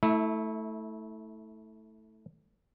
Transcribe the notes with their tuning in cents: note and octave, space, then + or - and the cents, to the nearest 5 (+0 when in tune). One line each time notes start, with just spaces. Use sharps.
A3 +0 E4 -25